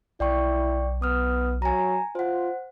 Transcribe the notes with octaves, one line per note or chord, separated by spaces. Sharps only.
B1 E4 D5 G5 C#6
B3 D#6 F6
F#3 G#5 A#5
F4 C5 F#5